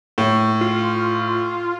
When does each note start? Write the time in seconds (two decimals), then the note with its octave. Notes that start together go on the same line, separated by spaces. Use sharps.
0.18 A2
0.61 F4